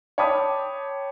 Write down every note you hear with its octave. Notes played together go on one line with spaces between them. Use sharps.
C#5 G5 A5 B5 D6 D#6